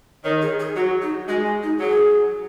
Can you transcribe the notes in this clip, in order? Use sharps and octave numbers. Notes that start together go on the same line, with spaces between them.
D#3 C#5
G#4
G#4
F#3 F#4
D#4
G#3 F#4
G#4
D#4
F#3 G#4